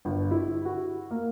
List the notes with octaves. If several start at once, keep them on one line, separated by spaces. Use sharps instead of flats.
G1
E4
F#4
A#3